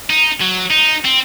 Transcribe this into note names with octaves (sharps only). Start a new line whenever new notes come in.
D#4
F#3
D#4
C4